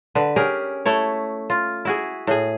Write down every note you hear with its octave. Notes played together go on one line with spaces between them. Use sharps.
D3 B4
C#4 G4 G#4 A#4
A3 E4 C#5
F4
E4 F#4 G#4
A2 G#4